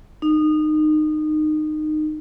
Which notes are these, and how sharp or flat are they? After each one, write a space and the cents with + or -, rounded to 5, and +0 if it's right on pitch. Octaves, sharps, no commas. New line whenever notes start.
D#4 -25